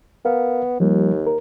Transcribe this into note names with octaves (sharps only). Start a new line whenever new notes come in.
B3 A#4 F5
D#2 F3 G3 A#3
A#4